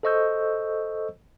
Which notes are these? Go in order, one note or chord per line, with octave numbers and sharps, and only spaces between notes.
A4 C5 D#5 C#6 E6 G6